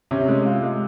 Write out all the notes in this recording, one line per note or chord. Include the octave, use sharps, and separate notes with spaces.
C3 C#4
G#3
F4
G#3